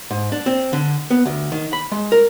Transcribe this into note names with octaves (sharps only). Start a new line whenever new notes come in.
G#2
D4
C4
D3
B3
D2
D#3
B5
G#3
A#4